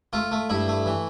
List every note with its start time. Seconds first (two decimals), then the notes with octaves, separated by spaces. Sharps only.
0.13 A3 F4
0.31 A3
0.50 G2 E4
0.68 A3
0.86 E3